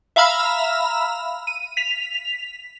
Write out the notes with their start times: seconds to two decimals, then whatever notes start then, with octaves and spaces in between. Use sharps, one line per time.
0.16 E5 F5 A#5 B5 E6 F6
1.47 D#7
1.77 B6 F7